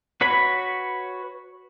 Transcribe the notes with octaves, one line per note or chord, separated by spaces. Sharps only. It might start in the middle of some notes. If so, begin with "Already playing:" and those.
F#4 B4 C#5 B5